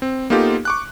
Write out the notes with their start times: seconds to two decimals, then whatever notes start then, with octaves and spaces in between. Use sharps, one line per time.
0.02 C4
0.30 A#3 B3 D#4 F4 G4 A4
0.65 C#6 D6 F#6